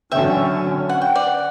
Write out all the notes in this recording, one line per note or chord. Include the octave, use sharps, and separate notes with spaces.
D3 F#3 C#4 E5 G5
F#5
G5
D5 F#5